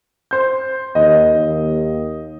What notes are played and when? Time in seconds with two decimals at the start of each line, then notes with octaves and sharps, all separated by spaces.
0.31 C5 G6
0.95 D#2 D#5
1.35 D#2